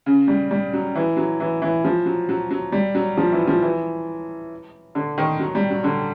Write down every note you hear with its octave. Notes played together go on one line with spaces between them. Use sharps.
C#3
G3
G3
F#3
E3
F#3
E3
E3
F3
F#3
F#3
F#3
G3
F#3
F3
E3
F3
E3
D3
D#3
F#3
G3
F#3
D3